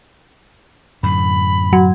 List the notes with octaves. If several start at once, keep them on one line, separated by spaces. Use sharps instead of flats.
F#2 A2 D3 B5
F#3